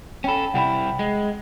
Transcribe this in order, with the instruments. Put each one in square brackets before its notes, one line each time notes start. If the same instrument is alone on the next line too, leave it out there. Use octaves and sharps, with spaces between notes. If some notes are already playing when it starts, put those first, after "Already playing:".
[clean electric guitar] C#4 A4 [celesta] G5 B5
[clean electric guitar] C2 G3 E4 [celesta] F#5 G5 B5
[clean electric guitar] G#3